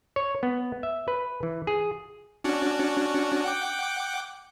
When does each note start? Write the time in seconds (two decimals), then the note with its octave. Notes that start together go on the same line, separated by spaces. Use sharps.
0.16 C#5
0.43 B3
0.83 E5
1.08 B4
1.43 E3
1.67 G#4
2.44 C#4 D4 F#4
3.44 F#5 G5 D6